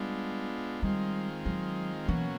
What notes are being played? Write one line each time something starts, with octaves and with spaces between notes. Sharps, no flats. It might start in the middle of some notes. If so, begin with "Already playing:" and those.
Already playing: G3 G#3 B3 D4 F4
D#3 G3 G#3 C4 F4
F#3
B2 E3 F#3 A#3 C#4